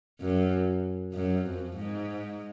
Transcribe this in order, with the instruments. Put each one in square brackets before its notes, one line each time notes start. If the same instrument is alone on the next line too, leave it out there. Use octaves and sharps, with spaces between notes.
[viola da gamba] F#2
F#2
F2
G#2